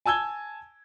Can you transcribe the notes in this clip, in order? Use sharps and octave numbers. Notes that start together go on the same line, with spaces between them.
G#5 A5 E6 G#6 G7